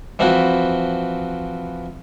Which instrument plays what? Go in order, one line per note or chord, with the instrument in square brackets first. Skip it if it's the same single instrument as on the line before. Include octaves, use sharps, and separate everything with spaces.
[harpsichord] E3 F3 C4 E4 F#4